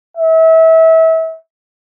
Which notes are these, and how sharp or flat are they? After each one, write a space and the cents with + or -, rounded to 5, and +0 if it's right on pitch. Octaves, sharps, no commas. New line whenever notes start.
E5 -30